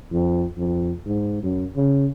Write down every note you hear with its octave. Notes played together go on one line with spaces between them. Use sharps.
F2
F2
G#2
F#2
C#3